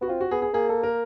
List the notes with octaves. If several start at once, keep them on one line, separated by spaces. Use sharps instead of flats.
B3 F#4
C4 F4
F#4
B3 G#4
G#4
A#3 G#4
A4
A#4